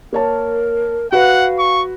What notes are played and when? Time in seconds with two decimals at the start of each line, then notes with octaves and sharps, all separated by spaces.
0.13 A#3 A#4 C#5 A5
1.12 F#4 B4 F5 F#5
1.59 C#6